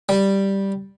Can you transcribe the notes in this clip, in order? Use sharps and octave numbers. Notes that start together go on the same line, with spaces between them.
G3